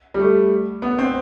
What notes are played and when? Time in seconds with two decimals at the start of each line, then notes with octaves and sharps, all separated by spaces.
0.14 G3
0.19 A3
0.82 B3
0.98 C4